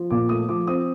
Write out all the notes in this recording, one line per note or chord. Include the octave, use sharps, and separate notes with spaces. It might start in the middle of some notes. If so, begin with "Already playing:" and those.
Already playing: F3
A#2 D6
A3 D#6
F3 D6
C4 D#6